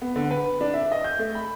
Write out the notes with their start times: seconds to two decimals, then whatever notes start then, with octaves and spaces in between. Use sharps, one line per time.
0.02 B3
0.16 D3
0.31 B4
0.61 D4
0.74 E5
0.92 D#5
1.04 G6
1.19 A3
1.35 B5